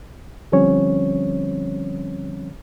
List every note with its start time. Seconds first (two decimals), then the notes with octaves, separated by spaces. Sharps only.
0.52 D3 F3 G3 C4 C#4 C#5